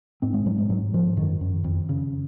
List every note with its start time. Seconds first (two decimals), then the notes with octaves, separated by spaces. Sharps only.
0.22 G#2 C4
0.34 G#3
0.45 G#2 F#3
0.58 G#3
0.69 G#2 F#3
0.94 G#2 F3
1.17 F#2 D#3
1.41 F#2
1.64 F2
1.89 C#3